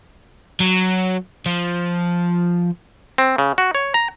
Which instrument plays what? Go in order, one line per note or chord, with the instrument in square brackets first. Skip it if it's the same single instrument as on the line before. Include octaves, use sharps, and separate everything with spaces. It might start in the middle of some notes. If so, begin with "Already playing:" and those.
[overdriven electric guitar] F#3
F3
[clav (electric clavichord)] C4
C#3
F#4
C#5
A#5